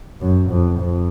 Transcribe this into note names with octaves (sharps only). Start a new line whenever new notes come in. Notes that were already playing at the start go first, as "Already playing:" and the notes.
F#2
F2
F2